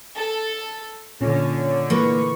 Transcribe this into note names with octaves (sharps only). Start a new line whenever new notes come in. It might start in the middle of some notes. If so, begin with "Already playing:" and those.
A4
A#2 D3 C#4
E3 A#3 B4 C#6